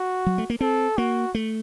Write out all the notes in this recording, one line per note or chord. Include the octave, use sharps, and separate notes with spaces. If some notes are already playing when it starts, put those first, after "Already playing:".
Already playing: F#4
F#3
A3
A#3
C4 A4
A#3 F#4
A3